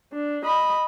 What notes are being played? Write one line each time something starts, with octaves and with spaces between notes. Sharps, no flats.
D4
D#5 B5